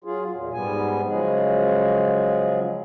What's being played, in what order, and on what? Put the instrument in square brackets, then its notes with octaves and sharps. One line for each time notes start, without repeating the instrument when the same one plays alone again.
[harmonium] F#3 F4 G#4
E2 A#2
G#2 G3 B3 G#5
C#3 F3 F#3 G#3 G#4